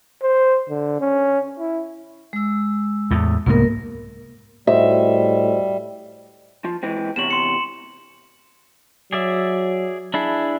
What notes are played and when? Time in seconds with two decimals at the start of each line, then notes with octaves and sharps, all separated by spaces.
0.22 C5
0.69 D3
1.00 C#4
1.59 E4
2.33 G#3 E6
3.11 E2 A2
3.46 C2 G#2 A#3 B3 A#4
4.67 A2 G3 F#4 C5 D#5 E5
6.65 F3
6.83 E3 G#3 C4
7.16 E2 C3 C#5 E7 F#7
7.31 C6 C#7
9.12 F#3 G#4 D5 E5
10.14 D4 E4 G#4